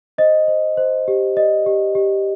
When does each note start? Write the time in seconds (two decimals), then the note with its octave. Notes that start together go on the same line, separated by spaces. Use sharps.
0.18 C5 D#5
0.48 C5
0.77 C5
1.08 G4
1.37 D5 D#5
1.66 G4
1.95 G4